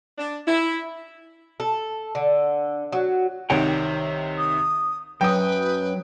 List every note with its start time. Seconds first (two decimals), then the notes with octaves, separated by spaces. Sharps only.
0.18 D4
0.47 E4
1.60 A4
2.15 D3
2.92 F#3
3.50 C2 C3 D#3 C#5 F#5 G5
4.38 D#6
5.21 F#2 F#3 B4 G5 D#6